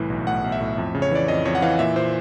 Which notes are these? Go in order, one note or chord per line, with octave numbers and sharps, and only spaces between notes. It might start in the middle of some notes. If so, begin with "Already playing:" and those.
Already playing: C2 A2 E3
B1
A2 F#5
B1
E5
A2
F2
C#3
C#5
E3 D5
F2 D#5
F2 C#5
F#5
E3 F5
A#2 E5
A#2 C5